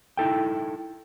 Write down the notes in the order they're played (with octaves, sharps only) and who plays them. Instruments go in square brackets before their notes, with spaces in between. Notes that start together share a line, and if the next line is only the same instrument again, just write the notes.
[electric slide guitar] D#4 E4 A4 G5